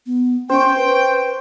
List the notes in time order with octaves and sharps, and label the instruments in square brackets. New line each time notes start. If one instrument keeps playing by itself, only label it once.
[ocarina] B3
[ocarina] C#4 [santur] C5 C#6 [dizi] G5
[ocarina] B4